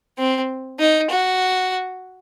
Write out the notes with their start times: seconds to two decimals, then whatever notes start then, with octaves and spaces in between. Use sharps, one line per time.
0.18 C4
0.80 D#4
1.10 F#4